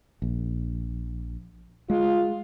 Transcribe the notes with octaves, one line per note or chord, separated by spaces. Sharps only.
A#1
G#3 F4